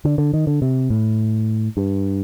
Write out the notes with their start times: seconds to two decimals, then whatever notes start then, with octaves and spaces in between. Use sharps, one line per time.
0.05 D3
0.18 D3
0.33 D#3
0.47 D3
0.62 C3
0.90 A2
1.77 G2